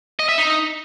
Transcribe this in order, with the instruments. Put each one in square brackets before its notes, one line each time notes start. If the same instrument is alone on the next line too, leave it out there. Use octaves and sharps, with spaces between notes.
[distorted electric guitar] D#5
E5
D#4